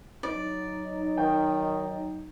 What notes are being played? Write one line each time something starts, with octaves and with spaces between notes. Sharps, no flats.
F#3 D#4 D5
D#3 G5